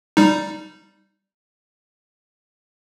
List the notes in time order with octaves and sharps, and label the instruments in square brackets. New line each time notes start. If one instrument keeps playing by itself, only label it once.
[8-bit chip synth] G3 D#4